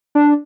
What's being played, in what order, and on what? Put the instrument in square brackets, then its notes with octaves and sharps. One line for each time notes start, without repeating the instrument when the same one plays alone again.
[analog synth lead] D4